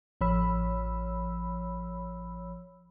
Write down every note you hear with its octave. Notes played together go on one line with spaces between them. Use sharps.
A1 F3 C#5 B5 E6